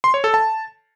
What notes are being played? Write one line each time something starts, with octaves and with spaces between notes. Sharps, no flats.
C6
C#5
A4
A5